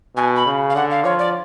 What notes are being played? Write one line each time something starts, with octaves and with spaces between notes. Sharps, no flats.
B2 G#5
B5
C#3
F5
D3 F#5
F5
F3 C#5
D5